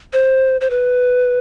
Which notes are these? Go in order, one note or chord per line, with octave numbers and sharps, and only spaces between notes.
C5
C5
B4